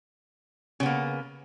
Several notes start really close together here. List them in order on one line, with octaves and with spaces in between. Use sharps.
C#3 B3 A#3